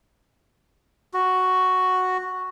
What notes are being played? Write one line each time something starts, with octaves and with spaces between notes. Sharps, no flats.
F#4